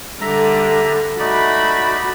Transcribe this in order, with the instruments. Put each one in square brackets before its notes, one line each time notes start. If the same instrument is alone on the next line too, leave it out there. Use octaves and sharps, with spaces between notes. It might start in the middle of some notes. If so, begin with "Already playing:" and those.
[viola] D3 G3 [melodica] E5 A#5
[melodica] A3 D#4 D5 [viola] F#4 B5